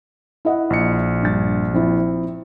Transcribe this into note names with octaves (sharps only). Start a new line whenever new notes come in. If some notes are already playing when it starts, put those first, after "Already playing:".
E4 D#5 F#5
A#1 C#7
G2 A6
F3 C4 E4